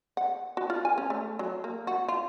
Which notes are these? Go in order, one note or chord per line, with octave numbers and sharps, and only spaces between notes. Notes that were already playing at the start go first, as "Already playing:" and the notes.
F#5
F#4
F4
G#5
C#4
A3
F#3
A#3
F#4
F4